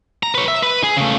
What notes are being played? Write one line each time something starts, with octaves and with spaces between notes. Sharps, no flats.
A#5
B4 C#5
E5
B4
G#4
C#3 A3